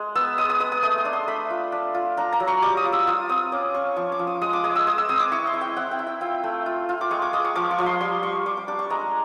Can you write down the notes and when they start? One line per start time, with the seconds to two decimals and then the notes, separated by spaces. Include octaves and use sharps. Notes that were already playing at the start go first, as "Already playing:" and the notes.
Already playing: G#3
0.15 B3 E6
0.38 G#3 D#6
0.50 D#6
0.60 G#3 D#6
0.72 D#6
0.83 A3 D#6
0.98 C6
1.05 D4
1.13 C6
1.28 A3 B5
1.50 F4
1.72 D4
1.94 F4
2.17 D4 A#5
2.32 A#5
2.40 F#3
2.47 C#6
2.62 G3 D6
2.77 D#6
2.85 F4
2.92 E6
3.07 F4 D#6
3.29 C4 D#6
3.52 C#4 D6
3.74 C#4 C#6
3.96 F3 C#6
4.12 D6
4.19 F3
4.27 D#6
4.42 G#3 D#6
4.53 D6
4.64 G#3 D#6
4.75 E6
4.87 G#3 D#6
4.98 E6
5.09 C4 D#6
5.20 D6
5.32 E4 C#6
5.47 C6
5.54 E4
5.61 G5
5.76 C4 F#5
5.91 G5
5.99 E4
6.07 G5
6.21 F4 G5
6.44 A3
6.66 F4
6.89 F4
7.01 D6
7.11 G#3 C#6
7.22 D6
7.33 G#3 D#6
7.44 C#6
7.55 F3 D6
7.71 C#6
7.79 F3
7.86 C6
8.00 G3 C6
8.23 G3 C#6
8.46 G3 D6
8.57 D6
8.68 D4 D6
8.79 C#6
8.90 G#3 A#5